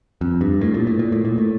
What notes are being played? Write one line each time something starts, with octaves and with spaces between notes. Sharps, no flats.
F2
G2
A2
A#2
A2
A#2
A2
A#2
A2